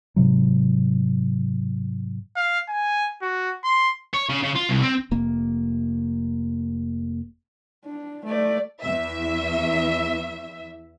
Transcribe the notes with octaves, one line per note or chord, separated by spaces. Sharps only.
G#2 C3 F#3
F5
G#5
F#4
C6
C#5
C#3
C#3
F4
C2
C4
F1 A#3
D4
A3 D5
E2 E5